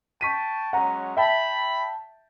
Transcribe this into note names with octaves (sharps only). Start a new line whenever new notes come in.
G5 A5 C#6 B6 D#7
F#3 G#3 C#4 F#5 A#5
E5 G5 A5 B5